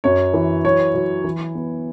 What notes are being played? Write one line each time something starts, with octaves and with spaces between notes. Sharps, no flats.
F#2 C#5
E3
F#3 C#5
F#3
E3
B3